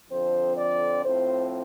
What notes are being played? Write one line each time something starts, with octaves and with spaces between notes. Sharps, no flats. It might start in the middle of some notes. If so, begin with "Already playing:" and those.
F2 D3 F3 C4 C5
D5
A2 F3 C4 C5